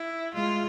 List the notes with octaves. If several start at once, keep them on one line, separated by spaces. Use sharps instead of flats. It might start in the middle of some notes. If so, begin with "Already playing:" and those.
Already playing: E4
G#3 F4